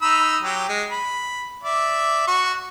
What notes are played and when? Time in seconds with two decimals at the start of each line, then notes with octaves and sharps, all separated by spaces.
0.02 D#4 B5 E6
0.42 F#3 G4
0.69 G#3
0.91 B5
1.63 D5 E5
2.28 F#4 C#6